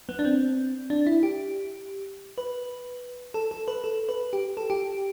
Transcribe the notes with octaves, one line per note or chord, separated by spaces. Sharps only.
B3
D4
C4
D4
E4
G4
B4
A4
A4
B4
A4
B4
G4
A4
G4